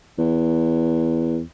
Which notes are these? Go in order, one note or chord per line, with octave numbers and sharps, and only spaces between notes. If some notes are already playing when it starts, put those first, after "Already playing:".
E2